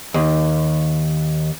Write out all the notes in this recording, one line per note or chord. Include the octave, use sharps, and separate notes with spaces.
D#2